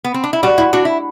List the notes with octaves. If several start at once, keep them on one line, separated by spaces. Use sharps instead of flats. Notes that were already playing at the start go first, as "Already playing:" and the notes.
B3
C4
D4
E4
G3 F#4
E4
D4 F#4
E4